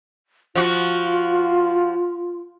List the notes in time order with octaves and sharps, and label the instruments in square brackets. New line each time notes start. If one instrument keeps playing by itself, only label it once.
[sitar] F3 F#4 [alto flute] F4